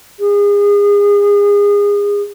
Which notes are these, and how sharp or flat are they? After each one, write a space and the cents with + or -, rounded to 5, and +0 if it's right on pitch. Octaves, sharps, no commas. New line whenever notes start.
G#4 -30